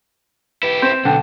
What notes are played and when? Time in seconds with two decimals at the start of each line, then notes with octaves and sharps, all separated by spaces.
0.63 E4 G4 B4
0.82 C4 G6 E7
1.05 B1 D3 G5